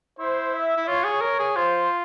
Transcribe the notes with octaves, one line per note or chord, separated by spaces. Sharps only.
E4 C5
E5
E4
F4 C#5
G#4
A#4 C#5
G#4
F4 C5